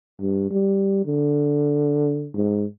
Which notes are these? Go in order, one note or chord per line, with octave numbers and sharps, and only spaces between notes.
G2
G3
D3
G#2